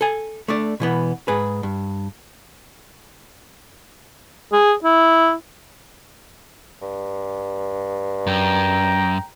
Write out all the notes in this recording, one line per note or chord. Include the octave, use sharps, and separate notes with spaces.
A4 G#5
A3 D4 D5
B2 E3 B3
G#2 G#4 B4
G2
G#4
E4
G2
F#2 G5 A#5